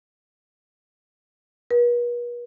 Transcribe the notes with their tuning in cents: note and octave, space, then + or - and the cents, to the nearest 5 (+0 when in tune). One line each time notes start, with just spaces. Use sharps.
B4 -45